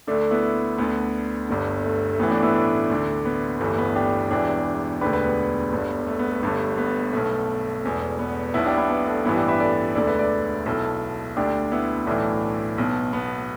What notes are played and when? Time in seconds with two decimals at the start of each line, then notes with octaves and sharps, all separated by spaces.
0.07 D2 D3 A3 D4
0.31 B3 E4
0.78 D2 D3 B3
1.49 G1 G2 D3
1.84 A3
2.13 A3
2.19 A1 A2 E3 B3
2.31 A3 D4
2.43 B3 E4
2.54 A3 D4
2.90 D2 D3
3.25 B3
3.60 G1 G2 E3 A3
3.78 B3
3.95 D4 G4
4.31 E1 E2 E3 D4 G4
5.01 E1 D2 D3 G4 B4
5.13 G4 B4
5.25 B3
5.72 G1 G2 D3
6.07 A3
6.19 B3
6.31 A3
6.42 G1 G2 D3 A3
6.78 B3
7.13 B1 B2 A3
7.84 E1 E2 B2
8.19 B3
8.54 B1 B2 B3 E4
8.66 D4 G4
8.78 B3 E4
8.90 B3
9.07 A3 D4
9.25 A1 G2 E3 B3 E4
9.36 D4 G4
9.48 B4 E5
9.60 A4 D5
9.95 E1 D2 D3 A4 D5
10.07 B4 E5
10.19 A4 D5
10.66 B1 B2 E4 A4
11.37 D2 D3 D4 G4
11.72 B3 E4
12.07 B1 A2 E3 A3 D4
12.78 B1 B2
13.13 B3